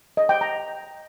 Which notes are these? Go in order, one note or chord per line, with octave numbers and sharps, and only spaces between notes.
D#5
G5
A#5